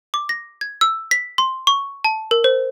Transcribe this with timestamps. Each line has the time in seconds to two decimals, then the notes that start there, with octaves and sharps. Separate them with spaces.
0.14 D6
0.29 A#6
0.61 G#6
0.81 E6
1.11 B6
1.38 C6
1.67 C#6
2.04 A5
2.31 A#4
2.44 C5